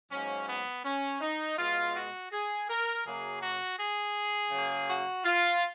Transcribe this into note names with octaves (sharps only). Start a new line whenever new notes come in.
G#2 F#3 A#3 C#4
B3
C#4
D#4
B2 G#3 F4
F#4
G#4
A#4
F#2 C#3 F#3 A#3 G#4
F#4
G#4
C#3 F#3 A#3
F#4
F4